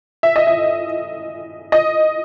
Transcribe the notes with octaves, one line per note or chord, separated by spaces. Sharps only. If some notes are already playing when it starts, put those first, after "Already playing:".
E5
D#5
E5
D#5